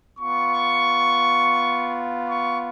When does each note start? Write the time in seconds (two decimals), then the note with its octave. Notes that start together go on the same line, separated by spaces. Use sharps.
0.18 B3 F4 C#6
2.28 C#6